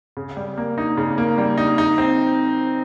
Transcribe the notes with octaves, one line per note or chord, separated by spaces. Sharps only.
C#3
G3
A#3
D#4
C#3
A#3
G3
D#4
D#4
C4